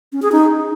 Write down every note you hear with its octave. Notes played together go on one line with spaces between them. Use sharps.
C#4
G#4
D#4